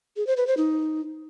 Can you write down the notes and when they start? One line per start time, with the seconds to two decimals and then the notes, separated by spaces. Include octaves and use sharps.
0.17 G#4
0.27 C5
0.37 B4
0.47 C5
0.57 D#4